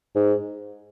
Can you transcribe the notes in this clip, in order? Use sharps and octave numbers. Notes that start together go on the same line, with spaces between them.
G#2